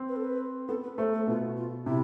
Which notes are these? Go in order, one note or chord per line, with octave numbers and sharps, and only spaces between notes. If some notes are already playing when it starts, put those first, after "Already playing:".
Already playing: C4
B4
A4
B4
B3 A4
B4
A3 C5
A4
B2 F4
F4
C3 E4